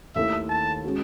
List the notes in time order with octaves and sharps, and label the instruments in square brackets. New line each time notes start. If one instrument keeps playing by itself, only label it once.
[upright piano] D#2 D#3 A3 E4 A4 [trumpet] E5
[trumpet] A5
[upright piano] G#3 C#4 F#4